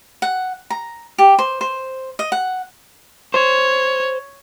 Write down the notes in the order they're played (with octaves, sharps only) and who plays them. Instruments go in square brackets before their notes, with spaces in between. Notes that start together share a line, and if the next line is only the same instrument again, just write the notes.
[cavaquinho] F#5
A#5
G4
C5
C5
D#5
F#5
[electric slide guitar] C5 [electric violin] C#5